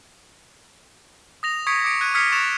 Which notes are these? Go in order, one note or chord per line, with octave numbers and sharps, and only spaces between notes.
D#6 A#6 F7
C#6 D#6 G#6 B6 C#7 D7
D6 D#6 C#7 D7
F#6 G#6 D#7
D#6 F6 G#6 B6 C#7 F7
C#6 A6 E7 F7